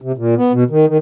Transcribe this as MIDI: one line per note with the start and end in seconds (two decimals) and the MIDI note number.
0.02 0.12 48
0.17 0.35 46
0.37 0.52 59
0.52 0.64 47
0.70 0.86 51
0.87 0.98 51